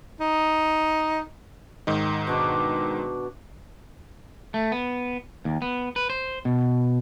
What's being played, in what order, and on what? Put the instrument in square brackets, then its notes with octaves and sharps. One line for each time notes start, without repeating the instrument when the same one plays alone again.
[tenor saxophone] D#4
[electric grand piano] G#2 D#3 D#4
[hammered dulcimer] B2 D4 D6
[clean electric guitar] A3
B3
D#2
B3
B4
C5
B2